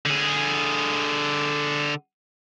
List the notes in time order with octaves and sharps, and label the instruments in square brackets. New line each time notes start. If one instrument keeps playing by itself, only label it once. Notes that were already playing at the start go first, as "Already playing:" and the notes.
[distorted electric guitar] D3 G#4